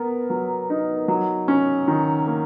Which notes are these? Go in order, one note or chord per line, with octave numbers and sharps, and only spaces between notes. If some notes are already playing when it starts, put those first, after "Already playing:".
Already playing: B3 A#4
F#3
D#4
F#3
C#4
D#3
A#3